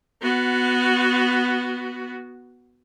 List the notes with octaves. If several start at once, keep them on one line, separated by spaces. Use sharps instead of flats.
B3 F#4